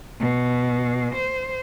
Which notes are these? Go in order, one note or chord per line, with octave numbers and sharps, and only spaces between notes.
B2
C5